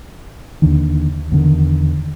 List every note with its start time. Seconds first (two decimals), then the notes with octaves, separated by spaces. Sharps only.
0.62 D#2 B2 D3 D#3
1.32 E2 D3 D#3